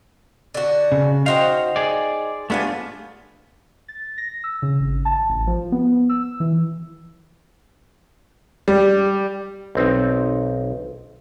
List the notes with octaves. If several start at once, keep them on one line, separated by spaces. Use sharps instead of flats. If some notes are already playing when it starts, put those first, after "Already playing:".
D3 F#4
C#3
D#4 F#4 C5 F5 G5
G#4 D5
G3 A3 B3 D4 F4 G#5
A6
A#6
E6
C#3
G#1
A5
A1
F3
B3
E6
E3
G3
B1 C4 D#4